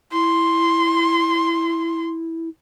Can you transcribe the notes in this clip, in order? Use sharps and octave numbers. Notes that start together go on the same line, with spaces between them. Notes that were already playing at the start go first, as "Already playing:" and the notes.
E4 C6